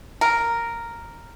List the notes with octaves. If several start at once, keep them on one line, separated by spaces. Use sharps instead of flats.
A#4